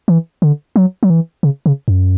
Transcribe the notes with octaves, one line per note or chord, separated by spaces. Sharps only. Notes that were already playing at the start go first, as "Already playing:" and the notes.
E3
D3
F#3
F#3
E3
C#3
C#3
F#2